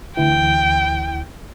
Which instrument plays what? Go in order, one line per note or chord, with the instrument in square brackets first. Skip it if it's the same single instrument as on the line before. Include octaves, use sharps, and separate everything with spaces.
[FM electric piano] D2 E3 [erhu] G5